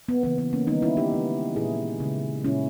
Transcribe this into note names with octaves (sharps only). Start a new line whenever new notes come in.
B3
C#3 E3 A#3 B3
B3
A#3 C#4
D#3 G3 A#3 B3 D#4
C#4 E4
D#4 G4
C#3 G#3
A#2 A#3 E4 G#4
C#3 G#3
A#2 G#3 C#4 E4